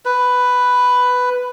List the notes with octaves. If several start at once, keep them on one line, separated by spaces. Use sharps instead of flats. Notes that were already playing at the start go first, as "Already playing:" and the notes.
B4